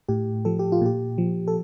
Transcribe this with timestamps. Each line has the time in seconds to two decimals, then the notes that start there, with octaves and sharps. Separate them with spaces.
0.09 A2 G4
0.45 F3 A4
0.59 G4
0.72 F4
0.81 A#2 G4
1.18 F3
1.48 A4